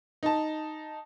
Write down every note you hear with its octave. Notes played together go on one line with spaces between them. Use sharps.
D#4 A5